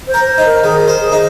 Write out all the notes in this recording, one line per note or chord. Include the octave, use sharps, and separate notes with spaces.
C5
A#4
C5
D#4
A#4
D#3 G#4
A#4
C5
G#4
D#4